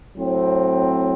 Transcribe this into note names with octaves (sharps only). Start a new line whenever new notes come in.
A2 F#3 C4